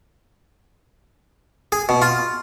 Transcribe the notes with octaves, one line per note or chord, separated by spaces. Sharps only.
G#4
B2
F4